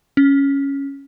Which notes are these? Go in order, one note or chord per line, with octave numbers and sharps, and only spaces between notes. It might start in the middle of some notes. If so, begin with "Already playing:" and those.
C#4